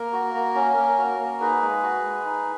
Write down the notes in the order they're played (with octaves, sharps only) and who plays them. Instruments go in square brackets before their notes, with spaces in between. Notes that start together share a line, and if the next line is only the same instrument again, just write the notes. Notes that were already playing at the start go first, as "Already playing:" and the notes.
Already playing: [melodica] A#3 A#4
F#4
A#3
C#4
A#3
F#4
A#3
D#4 G#4 B4
G#3
F#4
G#3
D#4